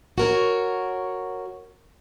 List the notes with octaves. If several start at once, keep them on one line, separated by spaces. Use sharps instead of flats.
F#4 A#4 C#5